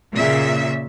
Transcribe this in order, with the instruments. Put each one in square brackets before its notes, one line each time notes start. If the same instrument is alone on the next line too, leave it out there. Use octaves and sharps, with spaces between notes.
[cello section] A#2 C#3 E5